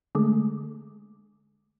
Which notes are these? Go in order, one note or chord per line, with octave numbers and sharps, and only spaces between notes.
D3 G#3 A3